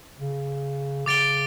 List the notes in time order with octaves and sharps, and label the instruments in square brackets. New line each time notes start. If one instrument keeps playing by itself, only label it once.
[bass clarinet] C#3
[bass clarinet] C#3 [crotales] D6 A6 D7 G7